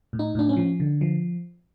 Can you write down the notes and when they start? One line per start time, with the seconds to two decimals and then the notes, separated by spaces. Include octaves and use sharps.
0.13 A2
0.19 D#4
0.35 A2 D4
0.49 C#4
0.56 F3
0.80 D3
1.01 F3